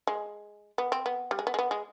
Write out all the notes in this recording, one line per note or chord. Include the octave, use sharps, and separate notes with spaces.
G#3
B3
C4
B3
G3
G#3
B3
G#3
B3
G#3